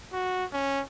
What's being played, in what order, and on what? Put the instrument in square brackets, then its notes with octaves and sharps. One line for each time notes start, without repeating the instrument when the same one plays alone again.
[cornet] F#4
C#4